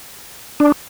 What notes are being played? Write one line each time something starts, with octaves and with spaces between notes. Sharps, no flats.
D4